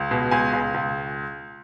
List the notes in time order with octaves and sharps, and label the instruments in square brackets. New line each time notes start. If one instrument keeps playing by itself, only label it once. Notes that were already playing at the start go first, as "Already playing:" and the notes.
Already playing: [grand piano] C#2
B2
C#2 G#5
C#2
C#2